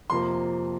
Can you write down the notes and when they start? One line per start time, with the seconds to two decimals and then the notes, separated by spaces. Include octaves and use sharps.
0.10 F2 C3 F3 A#3 C6